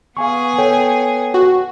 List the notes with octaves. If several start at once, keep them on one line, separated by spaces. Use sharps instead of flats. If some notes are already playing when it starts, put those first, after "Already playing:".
B3 G#4 F5 G#5 C#6
A4 C#5 G5
F#4